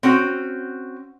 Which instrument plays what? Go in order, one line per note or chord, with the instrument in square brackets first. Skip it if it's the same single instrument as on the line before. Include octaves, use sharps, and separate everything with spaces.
[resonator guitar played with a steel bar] C4 C#4 F#4